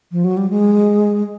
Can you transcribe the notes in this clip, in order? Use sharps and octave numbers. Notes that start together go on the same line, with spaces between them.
F3
F#3
G3
G#3